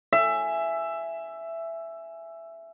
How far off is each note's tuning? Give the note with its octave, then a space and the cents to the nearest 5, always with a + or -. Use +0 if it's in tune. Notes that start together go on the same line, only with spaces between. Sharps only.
E5 +10 G#5 +0